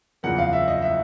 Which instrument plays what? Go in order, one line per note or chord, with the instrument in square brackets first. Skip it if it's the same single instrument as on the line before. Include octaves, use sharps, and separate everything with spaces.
[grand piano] F#1 E2 C#3 F3 A#3 F#5
F5
E5
D#5
E5